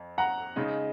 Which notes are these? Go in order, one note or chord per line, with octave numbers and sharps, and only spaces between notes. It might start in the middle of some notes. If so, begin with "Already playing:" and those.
Already playing: F2
F#5 A#5
C#3 G#3 D#4